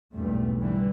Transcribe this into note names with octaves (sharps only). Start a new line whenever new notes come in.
B1 E2 G2 A#2 A3
D3 E3 G3